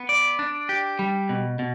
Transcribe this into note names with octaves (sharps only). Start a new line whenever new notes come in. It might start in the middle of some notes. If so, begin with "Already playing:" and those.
Already playing: B3
D5
D4
G4
G3
B2
B2